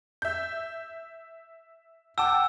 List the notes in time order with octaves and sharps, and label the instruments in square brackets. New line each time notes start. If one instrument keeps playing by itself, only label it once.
[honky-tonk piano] E5 G6
[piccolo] F#5 [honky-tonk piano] G5 A5 D6 [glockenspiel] E6